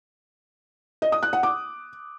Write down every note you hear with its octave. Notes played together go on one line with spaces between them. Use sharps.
D#5
D#6
F#6
F#5
D6